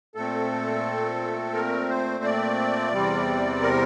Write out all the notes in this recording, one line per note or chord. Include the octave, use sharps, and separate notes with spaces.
A#2 A3 C4 A4
A#4
C5
D5
E2 C3 G3 C4
A#4